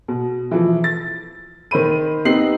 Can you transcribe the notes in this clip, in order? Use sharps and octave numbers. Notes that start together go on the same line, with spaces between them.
B2
E3 F3
A6
D#3 C5 B5 D#7
B3 C4 D#4 G4 C7 F#7